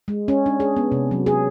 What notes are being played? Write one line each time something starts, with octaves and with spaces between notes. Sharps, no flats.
G#3
C#4
D4
G#4
B3
C3
F#3
G#4